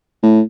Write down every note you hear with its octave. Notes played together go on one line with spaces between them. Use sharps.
A2